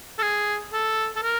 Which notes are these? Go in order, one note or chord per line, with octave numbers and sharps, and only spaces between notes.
A4
G#4
A4
A4
A#4